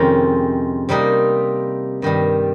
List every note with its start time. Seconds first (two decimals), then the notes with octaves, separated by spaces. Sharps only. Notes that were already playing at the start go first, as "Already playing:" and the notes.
Already playing: F2 C3 D#3 G#3 C#4
0.89 C3 G3 A#3 D#4
2.02 G2 D#3 G3